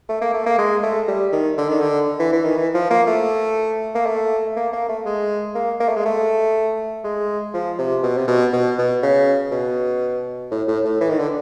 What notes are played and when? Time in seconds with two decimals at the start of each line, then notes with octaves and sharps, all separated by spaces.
0.09 A3
0.22 A#3
0.34 A3
0.46 A#3
0.59 G#3
0.83 A3
1.08 G3
1.32 D#3
1.58 D3
1.69 D#3
1.81 D3
2.20 E3
2.33 E3
2.45 D#3
2.57 E3
2.74 F3
2.90 A#3
3.07 A3
3.95 A#3
4.06 A3
4.56 A#3
4.73 A#3
4.89 A3
5.06 G#3
5.55 A#3
5.80 A#3
5.89 A3
5.97 G#3
6.05 A3
7.04 G#3
7.54 F3
7.78 C3
8.03 B2
8.17 C3
8.28 B2
8.53 B2
8.78 B2
9.03 C#3
9.52 B2
10.51 A2
10.68 A2
10.85 A2
11.01 E3
11.10 D#3
11.19 D3